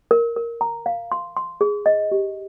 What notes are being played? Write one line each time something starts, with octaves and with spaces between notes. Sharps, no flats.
A#4
A#4
A#5
F5
C6
C6
G#4
D#5
G4